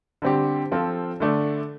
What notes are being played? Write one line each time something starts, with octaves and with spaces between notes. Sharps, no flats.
D3 G3 C4 G4
F3 C4 F4 A4
D3 A3 D4